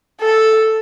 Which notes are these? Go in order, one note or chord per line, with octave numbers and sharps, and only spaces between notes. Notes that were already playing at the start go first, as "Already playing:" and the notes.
A4